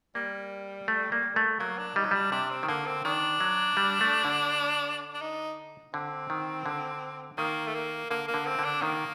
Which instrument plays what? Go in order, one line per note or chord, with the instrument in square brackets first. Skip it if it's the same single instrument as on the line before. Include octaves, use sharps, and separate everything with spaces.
[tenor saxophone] G3 [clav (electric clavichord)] A#3
[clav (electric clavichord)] A3
A#3
A3
[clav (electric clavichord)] F#3 [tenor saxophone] A#3
[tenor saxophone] D4
[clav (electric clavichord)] G3 [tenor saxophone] D#4
[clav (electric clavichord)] F#3
[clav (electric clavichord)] G3 [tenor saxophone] D4
[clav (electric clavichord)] C3 [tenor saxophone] D4
[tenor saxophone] C4
[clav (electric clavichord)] D#3
[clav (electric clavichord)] D3 [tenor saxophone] A#3
[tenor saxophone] C4
[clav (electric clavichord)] D#3 [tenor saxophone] D4
[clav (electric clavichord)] F#3
G3
A3
D3
[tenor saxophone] D4
D#4
[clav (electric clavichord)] D3 [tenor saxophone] C4
[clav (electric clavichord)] D#3
D3
[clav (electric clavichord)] D#3 [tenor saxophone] A#3
[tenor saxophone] A3
A#3
[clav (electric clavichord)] D3 [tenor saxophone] A#3
[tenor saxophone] A#3
[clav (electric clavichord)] D3
[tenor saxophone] C4
[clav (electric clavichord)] D3
[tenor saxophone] D4
[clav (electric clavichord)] D#3 [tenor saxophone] A#3